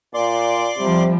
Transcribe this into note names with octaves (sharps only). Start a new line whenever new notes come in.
A#2 D5 C6 D6
C3 F3 G3